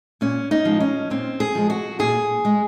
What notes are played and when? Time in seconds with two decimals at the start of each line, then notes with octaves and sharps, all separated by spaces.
0.21 A#2 C#4
0.51 D#4
0.65 F3 G#3
0.80 C#4
1.10 A#2 C4
1.40 G#4
1.55 F3 G#3
1.70 F#4
1.99 A#2 G#4
2.45 G#3